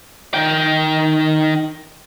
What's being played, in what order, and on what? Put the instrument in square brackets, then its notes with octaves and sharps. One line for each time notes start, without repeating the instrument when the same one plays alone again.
[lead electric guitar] D#3 G5